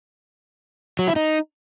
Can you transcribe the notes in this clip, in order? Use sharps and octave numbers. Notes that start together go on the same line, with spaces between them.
F#3
E4
D#4